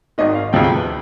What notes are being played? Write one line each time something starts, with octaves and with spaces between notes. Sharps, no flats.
G#1 G#2 D#3 D#5
F5
D2 C3 F3 G#3 G5
G5
B4